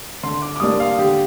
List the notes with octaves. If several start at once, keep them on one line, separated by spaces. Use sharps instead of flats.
D3 C6
D6
D6
G3 A#3 D4 D#6
F5
D3 G4